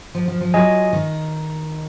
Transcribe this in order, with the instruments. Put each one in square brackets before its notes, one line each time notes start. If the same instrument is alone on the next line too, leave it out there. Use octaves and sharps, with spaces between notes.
[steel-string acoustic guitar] F3
F3
F3
[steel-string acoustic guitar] F#3 [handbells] F4 G#4 D#5 G#5
[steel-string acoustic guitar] D#3 D#4